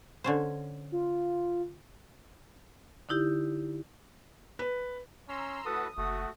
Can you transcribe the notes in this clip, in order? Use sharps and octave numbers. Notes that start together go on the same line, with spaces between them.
D3 C#4 C5
F4
D3 D#4 E4 G4
B4
C#4 A#5 C6 E6
A2 F#4 A4 B4 D#6
F#1 A3 F#4